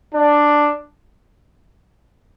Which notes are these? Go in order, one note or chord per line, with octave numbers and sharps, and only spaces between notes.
D4